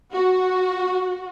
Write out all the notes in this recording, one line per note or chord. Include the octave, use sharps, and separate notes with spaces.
F#4